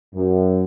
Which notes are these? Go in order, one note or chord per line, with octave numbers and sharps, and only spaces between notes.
F#2